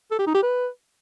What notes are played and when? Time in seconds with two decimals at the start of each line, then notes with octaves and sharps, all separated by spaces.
0.11 A4
0.19 G4
0.27 D#4
0.35 G4
0.42 B4